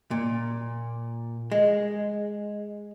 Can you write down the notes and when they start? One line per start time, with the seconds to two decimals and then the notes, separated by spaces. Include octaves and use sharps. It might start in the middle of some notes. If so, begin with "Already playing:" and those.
0.11 A#2
1.52 G#3